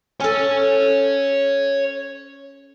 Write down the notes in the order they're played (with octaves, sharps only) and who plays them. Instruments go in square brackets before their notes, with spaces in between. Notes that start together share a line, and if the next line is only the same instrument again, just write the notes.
[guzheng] C#4 A4 [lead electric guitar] C#5 G#5